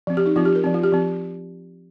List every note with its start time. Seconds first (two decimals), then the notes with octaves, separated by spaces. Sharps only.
0.07 F3 C4
0.17 G4
0.26 D#4
0.36 F3 C4 F4
0.45 G4
0.55 A#4
0.64 F3 C4
0.74 F4
0.83 G4
0.92 F3 C4